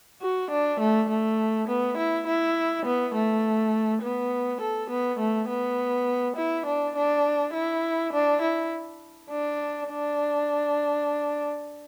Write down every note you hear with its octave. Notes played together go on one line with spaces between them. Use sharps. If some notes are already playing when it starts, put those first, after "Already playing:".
F#4
D4
A3
A3
B3
E4
E4
B3
A3
B3
A4
B3
A3
B3
E4
D4
D4
E4
D4
E4
D4
D4